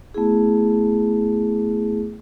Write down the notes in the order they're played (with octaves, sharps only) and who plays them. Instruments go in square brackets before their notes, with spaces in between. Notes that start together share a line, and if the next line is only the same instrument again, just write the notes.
[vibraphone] A3 B3 E4 G#4